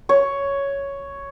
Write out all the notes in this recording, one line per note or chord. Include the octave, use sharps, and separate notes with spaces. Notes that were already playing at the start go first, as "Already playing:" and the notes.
C#5